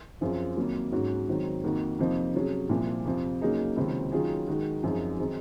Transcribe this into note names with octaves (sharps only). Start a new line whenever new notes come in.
F#2 F3 C4 F4 G#4
F2 D#3 F#3 A#3
G#2 F#3 C#4 F#4
G#2 D#3 F#3 C4
F2 D#3 A#3 D#4 F#4
F2 C3 F3 A#3 D#4
C3 F#3 C#4 G#4
C2 A#2 F3 C4
F2 C3 F3
C#3 F#3 A#3 D#4 G#4
C#2 C3 D#3 F#3 C4
D#3 F#3 C#4 F4 G#4
D#3 G#3 D#4 F#4
F#2 F3 C4 D#4 G#4
D#3 F#3 C4 D#4 G#4